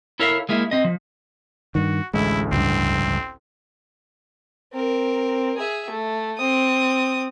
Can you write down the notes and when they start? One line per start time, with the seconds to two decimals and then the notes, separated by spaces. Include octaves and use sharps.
0.20 E4 A4 A#4 C#5 E5 F5
0.49 G#3 A#3 E4
0.71 C4 D#5
0.84 F3
1.75 G2 D#3 F#4
2.14 A1 D2 G#3 E4
2.52 C#2 G2 C4
4.73 C4 A#4
5.57 G#4 E5
5.90 A3
6.38 C4 D#6